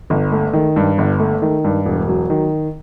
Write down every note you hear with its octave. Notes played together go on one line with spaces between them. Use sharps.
G1
A3
D#3
G2
G1
A3
D#3
G2
E1
F#3
D#3